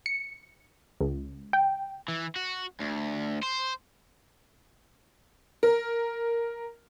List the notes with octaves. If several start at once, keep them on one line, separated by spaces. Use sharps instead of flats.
C#7
C#2
G5
E3
F#4
D2
C5
A#4